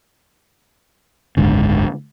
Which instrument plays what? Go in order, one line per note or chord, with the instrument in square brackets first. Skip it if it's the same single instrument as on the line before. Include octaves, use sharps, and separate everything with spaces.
[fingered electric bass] F#1 C#2 G#2 D3